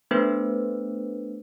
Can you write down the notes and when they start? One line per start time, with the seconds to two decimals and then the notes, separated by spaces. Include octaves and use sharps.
0.11 A3 B3 D4 A4 B4 C5